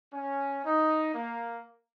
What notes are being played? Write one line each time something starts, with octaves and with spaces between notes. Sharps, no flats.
C#4
D#4
A#3